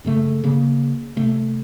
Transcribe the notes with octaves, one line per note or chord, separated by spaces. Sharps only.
F#2 C#3 A3
C#3 A#3
C3 A3